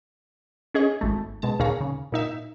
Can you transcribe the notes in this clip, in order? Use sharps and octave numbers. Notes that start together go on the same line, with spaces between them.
C#4 G#4 D#5 C#6
G#1 A3
B2 G#3 A5
D#2 A#2 G#4 C#5 F5 A#5
C#3
A#2 D#4 E5